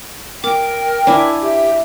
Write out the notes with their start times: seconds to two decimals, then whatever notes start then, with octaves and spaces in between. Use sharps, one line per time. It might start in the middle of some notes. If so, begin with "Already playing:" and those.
0.44 A#4 G5 D6
1.07 D4 E4 G#5
1.42 G4 E5